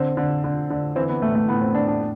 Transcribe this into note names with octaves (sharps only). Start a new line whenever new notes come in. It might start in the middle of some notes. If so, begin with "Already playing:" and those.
Already playing: D3 C4
D3
D3
D3
E3 C4
B3
A2 A3
A3
A2 B3
C4
A2 D4
D4